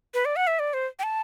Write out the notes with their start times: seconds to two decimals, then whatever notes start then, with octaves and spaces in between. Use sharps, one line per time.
0.14 B4
0.25 D5
0.36 F#5
0.47 E5
0.59 D5
0.74 C5
0.99 G5
1.03 A5